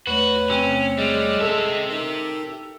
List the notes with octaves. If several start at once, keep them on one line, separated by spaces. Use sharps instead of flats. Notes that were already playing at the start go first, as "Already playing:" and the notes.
E2 A3 F#4 B4 C#5
C3 C#4
G3 G#3
G4 A4 E5
D#4 A#4